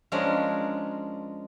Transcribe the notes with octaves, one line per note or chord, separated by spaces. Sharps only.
F3 G#3 C#4 D4 A#4